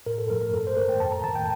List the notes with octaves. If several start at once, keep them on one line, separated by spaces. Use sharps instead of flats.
A2 A#4
A4
F3 A3 A#4
A#4
G2 A4
C5
D#3 A3 A#4
G5
F2 A5
A#5
D#3 A3 A5
G5